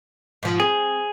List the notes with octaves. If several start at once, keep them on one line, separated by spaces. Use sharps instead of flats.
G#2 F3
C4 G#4